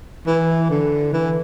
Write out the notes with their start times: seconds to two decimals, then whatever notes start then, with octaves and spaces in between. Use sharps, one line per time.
0.27 E3
0.70 D3
1.13 E3